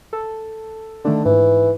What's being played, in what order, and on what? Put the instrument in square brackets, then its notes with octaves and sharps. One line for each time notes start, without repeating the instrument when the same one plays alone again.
[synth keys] A4
[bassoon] D3 [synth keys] D#3 A3 D4
[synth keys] G#2 [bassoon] E3